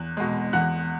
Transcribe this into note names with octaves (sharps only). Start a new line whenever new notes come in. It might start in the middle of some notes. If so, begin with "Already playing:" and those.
Already playing: E2 F#6
B2 G#3
E2 F#5 F#6